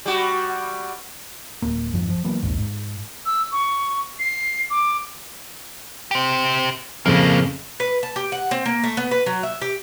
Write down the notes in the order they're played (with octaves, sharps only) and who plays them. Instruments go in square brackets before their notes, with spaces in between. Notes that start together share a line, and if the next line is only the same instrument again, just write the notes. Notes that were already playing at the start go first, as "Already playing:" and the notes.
[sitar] G3 F#4
[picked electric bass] D1 A#3
G1 F2 G#2 F3
F3
E3 F#3 A#3 B3
A#1 D#2 G#2
G#2
[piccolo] E6
C#6
C7
D6
[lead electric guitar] G4 C5
[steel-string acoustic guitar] F2 C#3 [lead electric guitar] A2 A#3
[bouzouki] B4
A5
G4
F#5
C4
A#3
A3
B3
B4
F#3
E5
G4